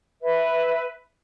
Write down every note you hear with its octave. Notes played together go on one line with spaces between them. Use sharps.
B4 E5